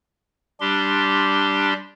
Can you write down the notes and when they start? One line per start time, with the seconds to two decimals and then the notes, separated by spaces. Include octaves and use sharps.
0.60 G3 D4 G4 C6